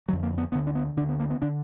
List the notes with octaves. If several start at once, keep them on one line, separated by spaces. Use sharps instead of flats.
F2 D3 F#3
A#3
B3
D2 D3 B3
D4
B3
D2 D3 D4
B3
A#3
B3
D3 D4